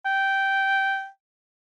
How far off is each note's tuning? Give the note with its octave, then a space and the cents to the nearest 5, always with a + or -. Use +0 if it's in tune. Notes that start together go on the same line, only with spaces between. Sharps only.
G5 -10